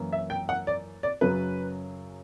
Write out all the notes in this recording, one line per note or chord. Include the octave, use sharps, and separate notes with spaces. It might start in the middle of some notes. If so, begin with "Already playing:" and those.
Already playing: F#2 E3 A#3
E5
G5
F#5
D5
D5
F#2 C#3 F#3 B4